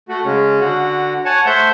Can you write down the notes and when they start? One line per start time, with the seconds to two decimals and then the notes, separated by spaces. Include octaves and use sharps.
0.09 A3 F#4
0.25 C#3 G#3 C#4
0.60 D3 F#4
1.25 C#5 F#5 G#5 A5
1.46 A3 C5 E5 F#5 G6